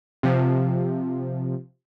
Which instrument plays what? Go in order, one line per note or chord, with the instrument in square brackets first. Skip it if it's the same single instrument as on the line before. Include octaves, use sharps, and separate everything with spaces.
[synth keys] C3 F3